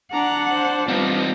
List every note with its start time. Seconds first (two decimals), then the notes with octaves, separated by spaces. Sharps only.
0.13 D4 F#5 A#5
0.51 C5
0.88 G3 B3 C4 D#4 F4